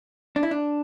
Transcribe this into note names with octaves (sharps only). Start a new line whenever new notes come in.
D4
E4
D4